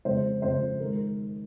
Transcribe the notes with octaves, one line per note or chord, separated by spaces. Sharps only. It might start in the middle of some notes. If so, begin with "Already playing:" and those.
F2 C#3 G#3 C5
F2 C#3 G#3 C5
D#3 G#3 A#4